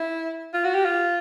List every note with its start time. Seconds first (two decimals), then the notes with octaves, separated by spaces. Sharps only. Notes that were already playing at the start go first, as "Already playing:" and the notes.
Already playing: E4
0.54 F4
0.64 F#4
0.75 G4
0.85 F4